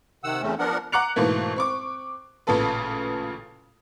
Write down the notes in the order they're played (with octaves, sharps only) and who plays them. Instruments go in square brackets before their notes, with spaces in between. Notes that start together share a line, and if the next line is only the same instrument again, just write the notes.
[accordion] C3 D#3 F#5 E6
E2 C#3 A3 C4 C#4
F3 B3 D4 A#4 F#5
[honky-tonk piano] F#5 A#5 D6 F#6 C#7 F7
G#2 B2 E3 A3 A#3
C4 C#6 D6
A1 A#2 C#3 B3 A4 B4